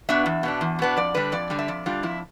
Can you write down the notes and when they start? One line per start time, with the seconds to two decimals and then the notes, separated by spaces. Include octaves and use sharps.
0.09 B2 B3 D4 E5
0.26 E2
0.43 B2 B3 D4
0.61 E2
0.79 B2 B3 D4
0.97 F2 D5
1.14 D3 G3 D4 B4
1.32 F2 D5
1.50 D3 G3 D4
1.59 E5
1.68 F2 D5
1.86 D3 G3 D4 F4
2.03 F2 E4